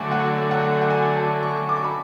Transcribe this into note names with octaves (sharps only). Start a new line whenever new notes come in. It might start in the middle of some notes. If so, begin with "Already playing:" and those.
Already playing: D3 F#3 A3 D4 F#4 G#5 A5
F#5
F#5
F#5
G#5
A5
C#6
D6
C#6
B5